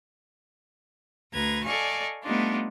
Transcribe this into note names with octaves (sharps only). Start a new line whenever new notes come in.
D2 B4 A#5 G#6
A4 D5 D#5 F5 G#5 C#6
G3 A3 B3 D4 D#4 F4